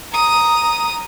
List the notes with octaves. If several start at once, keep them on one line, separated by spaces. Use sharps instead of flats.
A#5 D#6